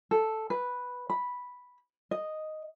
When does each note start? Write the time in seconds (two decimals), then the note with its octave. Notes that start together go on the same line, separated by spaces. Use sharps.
0.11 A4
0.50 B4
1.10 B5
2.11 D#5